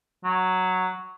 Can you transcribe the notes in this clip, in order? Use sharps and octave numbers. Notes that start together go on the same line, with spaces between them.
F#3